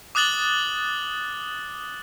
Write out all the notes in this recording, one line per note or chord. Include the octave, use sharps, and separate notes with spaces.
D6 D#6 F#6 A6 F#7 G7